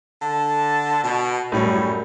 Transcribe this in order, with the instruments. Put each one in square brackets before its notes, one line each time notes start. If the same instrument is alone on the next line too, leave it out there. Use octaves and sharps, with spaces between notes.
[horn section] D3 A5
B2
[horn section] F#2 [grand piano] A2 G3 C#5